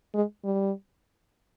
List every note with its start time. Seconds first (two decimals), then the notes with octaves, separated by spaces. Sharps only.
0.14 G#3
0.44 G3